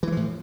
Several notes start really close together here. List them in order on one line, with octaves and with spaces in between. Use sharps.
E3 A3 F3 A2